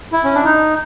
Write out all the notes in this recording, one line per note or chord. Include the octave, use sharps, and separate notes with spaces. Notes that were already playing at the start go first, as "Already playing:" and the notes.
E4
C#4
D4
D#4